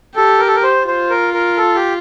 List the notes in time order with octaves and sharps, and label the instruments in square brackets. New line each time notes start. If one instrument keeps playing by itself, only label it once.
[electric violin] G4 [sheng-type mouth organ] A4
[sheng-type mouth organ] A#4
A4
A#4
C5
[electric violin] F4 [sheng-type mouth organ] C5
[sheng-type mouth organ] A#4
A#4
A4
G4